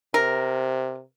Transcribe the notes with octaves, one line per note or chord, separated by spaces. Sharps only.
C3 A#4